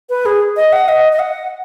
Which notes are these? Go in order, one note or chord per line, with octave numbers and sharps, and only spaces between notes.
B4
G#4
D#5
F#5
D#5
D#5
F#5